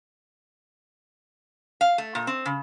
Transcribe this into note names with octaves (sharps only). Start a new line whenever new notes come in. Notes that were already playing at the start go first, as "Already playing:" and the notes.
F5
A3
A#2
C4
C#3